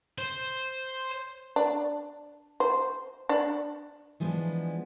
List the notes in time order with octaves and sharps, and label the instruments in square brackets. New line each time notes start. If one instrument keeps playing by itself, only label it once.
[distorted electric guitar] C5
[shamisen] D4
C5
D4
[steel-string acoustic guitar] E3 F3 G#3 B3 D4